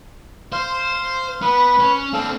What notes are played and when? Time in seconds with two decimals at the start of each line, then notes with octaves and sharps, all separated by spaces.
0.52 C5 F5 C6
1.42 B3 B4
1.79 C#4
2.14 C4 D4 A4 F5